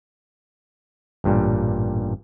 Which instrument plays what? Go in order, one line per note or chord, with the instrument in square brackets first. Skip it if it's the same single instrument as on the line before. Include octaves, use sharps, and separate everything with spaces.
[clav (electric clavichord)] A1 G2 A#2 G3